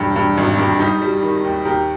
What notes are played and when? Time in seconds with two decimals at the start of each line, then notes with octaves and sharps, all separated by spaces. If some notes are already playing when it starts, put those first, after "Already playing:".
Already playing: E1 G2
0.16 G2
0.37 G#1
0.59 G2
0.80 G3 D#4 G4
1.02 G3
1.23 D#3
1.44 D#2
1.65 D#2 G4 A#4